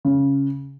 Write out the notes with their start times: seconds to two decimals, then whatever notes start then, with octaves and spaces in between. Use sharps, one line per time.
0.05 C#3